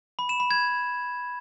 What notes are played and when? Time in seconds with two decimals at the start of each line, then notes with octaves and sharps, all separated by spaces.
0.19 B5
0.29 E7
0.40 B5
0.51 G#6